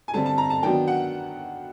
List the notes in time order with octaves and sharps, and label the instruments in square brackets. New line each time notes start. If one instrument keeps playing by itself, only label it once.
[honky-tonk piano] G#5
D3 G3 C4 A5
A5
A#5
A5
D#3 F#3 B3 D4 G5
F#5